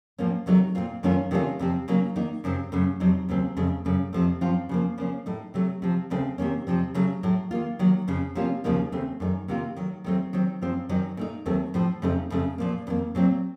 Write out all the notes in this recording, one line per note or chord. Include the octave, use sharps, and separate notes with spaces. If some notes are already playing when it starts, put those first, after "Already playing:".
A2 F3 A#3 C#4
C3 D#3 F#3 A3 D#4
A#2 A3 C4 F4
F#2 D#3 A3 C#4 F4
C3 D#3 A3 C#4 F4
F2 C3 F3 C4
C#3 F#3 A#3 D#4
D#3 A#3 D#4
F#2 C#3 F#3 C4
F#2 C#3 A3
F2 C3 F#3 C4 D#4
D#2 C#3 F#3 C4
F2 C#3 A3
F#2 C#3 A3
F2 C3 F3 A3
F#2 F3 C4 F4
C#3 F3 A#3
C#3 F3 A#3 C#4
A2 A3 D#4
C3 F#3 A3
C3 F3 C4
D#2 C#3 A3 C4
C3 D#3 A#3 C#4
F2 C3 F3 C4
C#3 F#3 A3
A2 F#3 A3
D#3 A#3 F4
D#3 F#3 A#3
F2 C#3 F3
C3 F3 A#3 C#4 F4
D#2 C#3 F3 A#3 D#4
D#2 C#3 A3 C4
F#2 D#3 A3 D#4
C3 D#3 A#3 F4
D#3 F#3 A3
D#3 F#3 A3 C4
D#3 F#3 C4
F#2 F3 C4 F4
F#2 D#3 F#3 C4 D#4
A#2 A3 D#4
D#2 D#3 F#3 A3 C4
A2 F3 C4
F2 C#3 A3 C4 D#4
F2 C#3 A3
A#2 F3 A#3
F2 D#3 A#3
A#2 F#3 C4